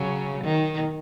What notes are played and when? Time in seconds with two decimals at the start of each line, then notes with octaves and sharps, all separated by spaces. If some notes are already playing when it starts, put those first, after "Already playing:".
Already playing: C#3 F#3
0.44 D#3